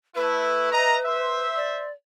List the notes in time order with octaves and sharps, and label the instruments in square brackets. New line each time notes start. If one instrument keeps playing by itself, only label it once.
[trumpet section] A3 E4 [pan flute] B4
[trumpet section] D#5 E5 A#5
C5 E5
[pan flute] D5